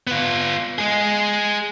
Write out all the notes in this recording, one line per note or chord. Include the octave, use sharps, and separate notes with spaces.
B3 F4
G#3 G#4